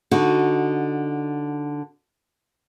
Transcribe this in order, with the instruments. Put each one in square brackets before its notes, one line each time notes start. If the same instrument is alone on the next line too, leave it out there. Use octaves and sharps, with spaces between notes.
[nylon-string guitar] D3 D#4 F#4